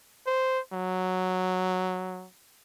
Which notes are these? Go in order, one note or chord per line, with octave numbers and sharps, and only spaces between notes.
C5
F#3